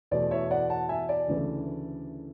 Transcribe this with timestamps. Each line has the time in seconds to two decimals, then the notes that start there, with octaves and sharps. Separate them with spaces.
0.11 E2 B2 A3 D5
0.31 C#5 E5
0.51 D5 F#5
0.70 F#5 A5
0.89 E5 G#5
1.09 D5
1.28 D2 C#3 E3 A3